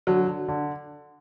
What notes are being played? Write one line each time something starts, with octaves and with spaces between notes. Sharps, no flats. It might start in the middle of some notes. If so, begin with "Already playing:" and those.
D3 F#3
D3
D3